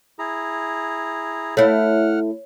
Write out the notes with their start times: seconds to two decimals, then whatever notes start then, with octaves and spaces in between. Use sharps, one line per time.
0.19 E4 G#4 A#5
1.57 A3 E4 C#5 F#5 F6